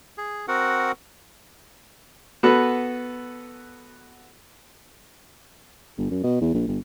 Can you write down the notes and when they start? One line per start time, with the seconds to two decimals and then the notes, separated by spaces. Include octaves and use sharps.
0.18 G#4
0.48 C4 F#4 A#4 F#5
2.43 B3 F#4 A4 B4
5.97 G1
6.11 F#2
6.23 B2
6.41 E2
6.54 A#1
6.67 G1